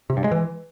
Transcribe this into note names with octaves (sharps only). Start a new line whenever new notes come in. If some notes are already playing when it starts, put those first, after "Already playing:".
C3
G2
G#3
E3